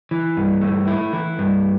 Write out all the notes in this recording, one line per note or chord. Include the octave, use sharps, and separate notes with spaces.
E3
G2
A3
E4
E3
G2